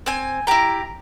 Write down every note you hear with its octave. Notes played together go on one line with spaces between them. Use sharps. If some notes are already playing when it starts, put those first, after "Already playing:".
C4 G#5
E4 G4 A#5